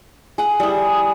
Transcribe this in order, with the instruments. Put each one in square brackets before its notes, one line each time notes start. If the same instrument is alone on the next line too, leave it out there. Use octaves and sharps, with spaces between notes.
[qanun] G#4 F#5
[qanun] G3 E4 [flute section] G#5 D#6